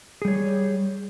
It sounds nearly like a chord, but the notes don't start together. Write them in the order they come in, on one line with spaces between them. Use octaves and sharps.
G#4 G3 C#5